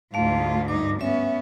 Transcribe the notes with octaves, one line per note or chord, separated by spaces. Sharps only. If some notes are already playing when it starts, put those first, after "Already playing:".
D2 G#2 A3 F4 F5
G2 D#4 D6
B3 C#4 E5